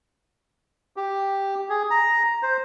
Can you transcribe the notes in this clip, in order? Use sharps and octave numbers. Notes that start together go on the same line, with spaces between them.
G4
G#4
A#5
C5